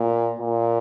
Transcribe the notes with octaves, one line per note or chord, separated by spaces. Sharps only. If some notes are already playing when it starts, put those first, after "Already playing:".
Already playing: A#2
A#2